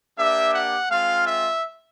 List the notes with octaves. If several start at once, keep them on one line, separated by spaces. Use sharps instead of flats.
A#3 D4 G4 E5
F#5
G#3 C4 F4 F5
E5